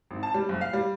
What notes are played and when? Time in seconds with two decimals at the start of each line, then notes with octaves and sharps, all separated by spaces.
0.11 G#1
0.23 A5
0.34 G3
0.49 F#1
0.61 F5
0.73 G3